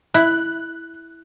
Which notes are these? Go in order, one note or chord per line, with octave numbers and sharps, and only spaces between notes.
E4 F#6